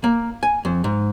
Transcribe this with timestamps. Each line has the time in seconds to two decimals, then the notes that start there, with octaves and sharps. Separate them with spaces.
0.04 A#3
0.43 G#5
0.65 F2
0.84 G#2